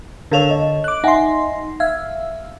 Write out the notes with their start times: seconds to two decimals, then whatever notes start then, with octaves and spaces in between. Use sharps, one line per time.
0.32 D3 A4 A#4 C#5 F5 F7
0.50 D#5
0.84 D6 F#6
1.04 D#4 E5 F#5 G#5 C6
1.80 E5 F5 G#6